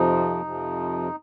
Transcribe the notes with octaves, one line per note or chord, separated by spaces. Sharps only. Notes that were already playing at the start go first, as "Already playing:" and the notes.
Already playing: F2 C3 F3 D#4
F2 C3 F3